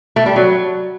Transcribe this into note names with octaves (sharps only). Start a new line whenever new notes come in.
A3
G3
F#3